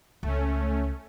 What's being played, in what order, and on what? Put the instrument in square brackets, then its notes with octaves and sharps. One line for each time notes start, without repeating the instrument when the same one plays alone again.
[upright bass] C#2 [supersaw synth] A3 C#4